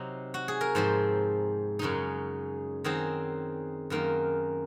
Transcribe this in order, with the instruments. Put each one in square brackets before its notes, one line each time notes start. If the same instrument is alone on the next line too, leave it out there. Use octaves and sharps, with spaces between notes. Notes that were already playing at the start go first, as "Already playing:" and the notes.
Already playing: [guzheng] C3 F#3 C4 D#4
F#4
G#4
A#4
G#2 F3 C4 C5
F#2 C#3 G#3 D#4
D#3 F#3 C4 D#4 G#4
F#2 D#3 A#3 F4